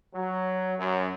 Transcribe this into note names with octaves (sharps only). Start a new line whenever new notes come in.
F#3
F#2